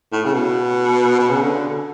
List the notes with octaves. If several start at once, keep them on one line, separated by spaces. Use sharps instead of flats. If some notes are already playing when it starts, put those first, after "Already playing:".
A2
C#3
B2
B2
C#3
D3